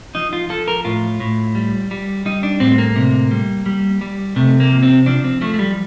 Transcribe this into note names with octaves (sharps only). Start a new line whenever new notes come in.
F3 D#4
F4
F3 A4
A#4
A2 F4
A2
G3
G3
G3 D#4
D4
A2 C4
A#3
C3
G3
G3
G3
C3 A3
A#3
F3
C4
F3 D4
C4
F3 A3
A3
G3